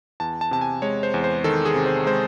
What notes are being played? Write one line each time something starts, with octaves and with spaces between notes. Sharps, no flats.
E2 A5
A5
C3 A5
G#5
G#3 C#5
C5
E2
C5
D#3 A4
G#4
C3
C5
G#3 C5